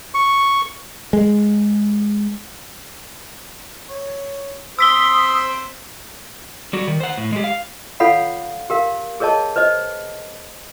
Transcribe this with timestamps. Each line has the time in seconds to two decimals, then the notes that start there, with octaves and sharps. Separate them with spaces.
0.14 C#6
1.13 G#3
3.89 C#5
4.79 C4 C5 D#6 E6 B6 G7
6.73 G3 F#4
6.88 D#3
7.00 C5 F#5
7.17 A2
7.33 G#3 G4
7.44 F5
8.00 F4 A4 C#5 F5 F#5 B5
8.70 G4 A#4 F5
9.20 G#4 A#4 C#5 D#5 A5
9.56 B4 C5 D#5